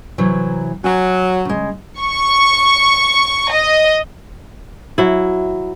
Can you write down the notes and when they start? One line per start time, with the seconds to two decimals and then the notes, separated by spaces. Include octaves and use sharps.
0.18 C3 E3 F#3
0.84 F#3 G#5
1.45 C#3 G#3
2.00 C#6
3.53 D#5
4.98 F#3 E4